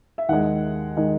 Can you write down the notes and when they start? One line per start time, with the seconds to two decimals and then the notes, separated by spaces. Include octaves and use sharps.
0.18 E5
0.29 D#2 D#3 G#3 F#5
0.97 D#3 G#3